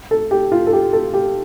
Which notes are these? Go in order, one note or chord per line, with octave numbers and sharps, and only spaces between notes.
A4
G4
F4
A4
G4
A4
G4